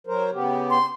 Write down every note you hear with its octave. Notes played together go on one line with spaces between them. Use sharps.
F#3 A#4 C5
C#3 B3 G4
C6